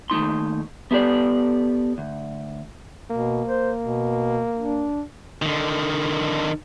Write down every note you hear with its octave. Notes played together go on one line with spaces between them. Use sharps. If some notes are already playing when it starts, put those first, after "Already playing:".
D#2 A3 D#4 C6
B3 E4 G4 A4 D5
D2
B2 A#3
C5
B2
D4
D3 D#3